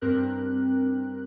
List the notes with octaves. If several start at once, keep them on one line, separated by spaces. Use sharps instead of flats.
G2 C4 G4 A#4 F#6